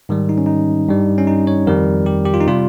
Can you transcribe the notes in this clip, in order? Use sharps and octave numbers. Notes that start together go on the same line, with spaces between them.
G#2 D#3 G3
D#4
C#4
D#4
G2 G3
C#4
D#4
C#5
F2 D#3 G3 A#4
G4
G4
F4
D#4
C3 G3 F4